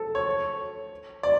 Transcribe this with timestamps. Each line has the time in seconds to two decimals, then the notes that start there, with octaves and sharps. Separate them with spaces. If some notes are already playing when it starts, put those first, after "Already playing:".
Already playing: A4
0.15 C#5
1.23 D5